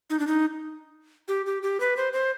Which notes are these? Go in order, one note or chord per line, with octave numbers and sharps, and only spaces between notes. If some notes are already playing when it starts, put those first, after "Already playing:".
D#4
D4
D#4
G4
G4
G4
B4
C5
C5